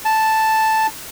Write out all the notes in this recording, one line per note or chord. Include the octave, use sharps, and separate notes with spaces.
A5